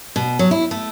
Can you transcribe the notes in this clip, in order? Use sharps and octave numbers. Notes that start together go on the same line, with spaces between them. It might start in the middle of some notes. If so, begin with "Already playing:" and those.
B2
F#3
E4
A3